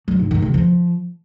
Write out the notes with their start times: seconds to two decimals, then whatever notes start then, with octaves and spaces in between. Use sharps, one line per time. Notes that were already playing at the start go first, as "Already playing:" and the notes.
0.08 F#3
0.19 G#2
0.31 D#3
0.42 C#3
0.54 F3